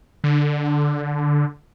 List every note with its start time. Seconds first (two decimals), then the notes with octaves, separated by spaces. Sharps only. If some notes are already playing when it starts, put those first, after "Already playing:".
0.24 D3